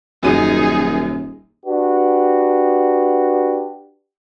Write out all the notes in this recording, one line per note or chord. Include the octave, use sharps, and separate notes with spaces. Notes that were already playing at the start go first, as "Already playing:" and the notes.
D#1 F#2 F#3 D#4 G#4 D#7
D4 F#4 G4 B4